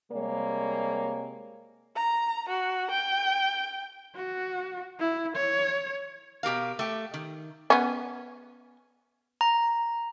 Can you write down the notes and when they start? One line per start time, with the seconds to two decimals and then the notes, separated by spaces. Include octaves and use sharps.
0.12 C3 G3 G#3 A#3 C#5
1.96 A#5
2.49 F#4
2.91 G5
4.16 F#4
5.00 E4
5.36 C#5
6.43 B2 G4 A#4 F5
6.79 A3 G4
7.14 D#3
7.70 B3 C#4
9.41 A#5